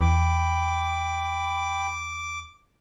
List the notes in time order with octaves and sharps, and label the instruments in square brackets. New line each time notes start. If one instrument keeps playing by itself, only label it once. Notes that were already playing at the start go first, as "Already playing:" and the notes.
[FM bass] E2 [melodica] G5 B5 [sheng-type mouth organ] D6